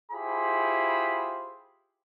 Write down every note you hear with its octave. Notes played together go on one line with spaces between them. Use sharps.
E4 F4 G4 G#4 C5 B5